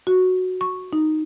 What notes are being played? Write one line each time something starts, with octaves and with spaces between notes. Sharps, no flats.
F#4
C#6
D#4